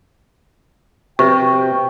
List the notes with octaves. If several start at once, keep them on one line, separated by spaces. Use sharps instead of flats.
C3 B4 G5 C#6